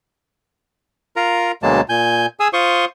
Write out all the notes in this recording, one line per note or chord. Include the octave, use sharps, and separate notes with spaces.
F4 A#4 A#5
D2 B2 F#3 G#3 A#3 A5
A#2 G#5 G6
G#4 G#5 D#6 E6
F4 C5 C6 C#6 D#6